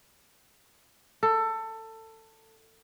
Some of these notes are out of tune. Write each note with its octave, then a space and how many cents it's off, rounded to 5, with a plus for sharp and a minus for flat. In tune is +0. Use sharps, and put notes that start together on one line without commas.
A4 +20